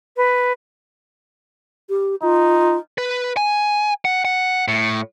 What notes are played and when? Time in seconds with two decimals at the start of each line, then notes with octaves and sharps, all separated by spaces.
0.17 B4
1.89 G4
2.22 D#4 F4
2.98 B4
3.37 G#5
4.05 F#5
4.25 F#5
4.68 A2